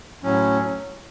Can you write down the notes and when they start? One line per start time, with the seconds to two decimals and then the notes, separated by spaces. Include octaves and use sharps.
0.23 A2 F#3 C#4